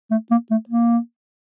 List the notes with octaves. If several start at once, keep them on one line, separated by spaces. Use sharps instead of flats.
A3
A#3
A3
A#3